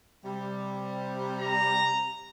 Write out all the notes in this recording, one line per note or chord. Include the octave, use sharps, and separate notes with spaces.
C3 G3
A#5